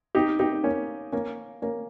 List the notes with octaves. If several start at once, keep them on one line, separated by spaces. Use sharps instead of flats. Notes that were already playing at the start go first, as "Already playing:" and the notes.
D#4 G4
D#4 G4
A#3 C#4
A#3 C#4
A#3 C#4